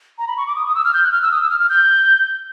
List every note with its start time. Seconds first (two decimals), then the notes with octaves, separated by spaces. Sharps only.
0.18 A#5
0.27 B5
0.37 C#6
0.47 D6
0.56 D#6
0.66 D#6
0.75 E6
0.85 F6
0.94 G6
1.04 F#6
1.12 F6
1.22 E6
1.32 D#6
1.41 E6
1.50 F6
1.60 F6
1.69 G6